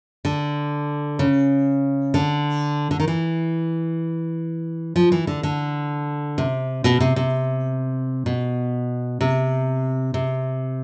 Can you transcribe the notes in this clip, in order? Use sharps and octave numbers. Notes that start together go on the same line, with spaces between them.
D3
C#3
D3
D3
D#3
E3
F3
E3
D3
D3
C3
B2
C3
C3
B2
C3
C3